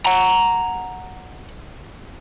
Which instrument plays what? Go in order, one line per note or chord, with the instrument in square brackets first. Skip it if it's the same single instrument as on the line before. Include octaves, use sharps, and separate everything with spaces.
[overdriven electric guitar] F#5 A#5